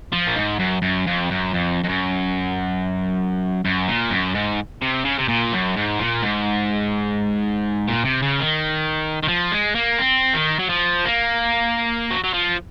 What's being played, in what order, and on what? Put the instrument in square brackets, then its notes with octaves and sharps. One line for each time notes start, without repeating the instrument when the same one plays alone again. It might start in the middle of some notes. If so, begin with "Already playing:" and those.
[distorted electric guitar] F3
A#2
G#2
F#2
F#2
F2
F#2
F2
F2
F#2
F#2
A#2
F#2
G#2
C3
C#3
C3
A#2
F#2
G#2
A#2
G#2
A#2
C3
C#3
D#3
D#3
F3
G#3
A#3
C4
D#3
F#3
F3
A#3
F#3
F#3
F3